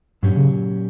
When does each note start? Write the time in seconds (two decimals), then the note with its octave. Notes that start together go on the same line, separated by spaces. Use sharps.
0.23 G2 A#2 F#3 C#4 G4
0.37 C#3